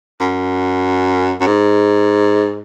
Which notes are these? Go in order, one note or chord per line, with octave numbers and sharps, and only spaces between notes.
F#2
F#2
G#2